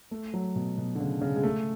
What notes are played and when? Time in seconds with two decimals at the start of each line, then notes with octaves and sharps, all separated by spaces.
0.11 A3
0.34 F#3
0.56 B2
0.78 B2
0.95 D3
1.00 C#3
1.21 C#3
1.36 G#3
1.43 A3